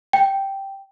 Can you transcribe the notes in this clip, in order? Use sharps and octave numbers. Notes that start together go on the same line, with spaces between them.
G5